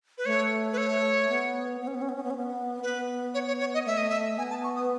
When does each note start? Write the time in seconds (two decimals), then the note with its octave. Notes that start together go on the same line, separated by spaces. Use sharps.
0.18 B4
0.26 A3 C#5
0.73 B4
0.78 C#5
1.29 B3
1.81 B3
1.87 C#4
1.95 B3
2.02 C#4
2.09 B3
2.16 C#4
2.24 B3
2.30 C#4
2.37 B3
2.83 B3 B4
3.34 C#5
3.48 C#5
3.60 C#5
3.74 D#5
3.87 A3 E5
3.97 D#5
4.09 E5
4.38 B3 G#5
4.50 A5
4.64 C#6
4.76 D#6